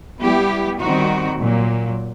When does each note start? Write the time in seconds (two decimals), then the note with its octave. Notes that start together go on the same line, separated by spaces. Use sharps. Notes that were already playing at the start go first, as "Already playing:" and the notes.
0.19 G3 B3 E4 G4
0.79 D#3 G3 C4 D#4 F#4
1.39 A#2 F#3 A#3